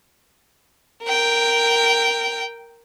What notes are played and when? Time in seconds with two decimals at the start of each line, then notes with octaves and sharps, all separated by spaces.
1.04 A#4 G5